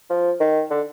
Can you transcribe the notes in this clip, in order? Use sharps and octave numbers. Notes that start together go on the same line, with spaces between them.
F3
D#3
D3